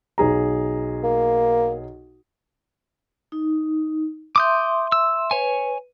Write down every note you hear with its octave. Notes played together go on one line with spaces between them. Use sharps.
B1 G#4 A#5
A#3
D#4
E5 C6 D6 D#6 G6
E6
B4 C#5 G#5